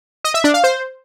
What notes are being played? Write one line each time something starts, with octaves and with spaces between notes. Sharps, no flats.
D#5
E5
D4
F5
C5